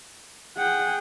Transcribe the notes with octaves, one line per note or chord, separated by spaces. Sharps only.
G#4 F#5 G5